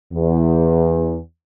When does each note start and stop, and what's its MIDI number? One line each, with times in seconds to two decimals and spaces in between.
0.13 1.17 40